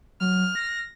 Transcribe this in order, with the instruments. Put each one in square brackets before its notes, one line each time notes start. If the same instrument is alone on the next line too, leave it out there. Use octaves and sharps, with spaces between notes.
[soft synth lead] F#3 [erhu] F6
[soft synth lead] A#6